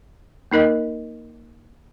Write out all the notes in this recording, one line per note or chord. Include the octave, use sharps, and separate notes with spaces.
A#3 D#4 A#4 D#5